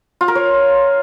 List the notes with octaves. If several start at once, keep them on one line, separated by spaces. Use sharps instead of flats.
F4
A#4
C#5